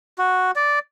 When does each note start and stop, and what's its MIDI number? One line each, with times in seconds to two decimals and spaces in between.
0.18 0.51 66
0.56 0.79 74